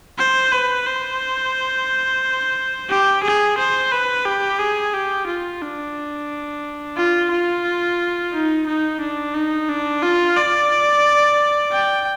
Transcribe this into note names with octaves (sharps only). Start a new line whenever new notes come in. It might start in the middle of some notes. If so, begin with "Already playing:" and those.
C5
B4
C5
G4
G#4
C5
B4
G4
G#4
G4
F4
D4
F4
F4
D#4
D#4
D4
D#4
D4
F4
D5
G5